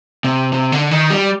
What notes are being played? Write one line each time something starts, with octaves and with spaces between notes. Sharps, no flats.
C3
C3
D3
D#3
G3